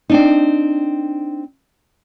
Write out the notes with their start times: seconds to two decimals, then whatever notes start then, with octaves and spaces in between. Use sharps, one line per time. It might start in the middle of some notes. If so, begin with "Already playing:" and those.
0.10 C4 D4 D#4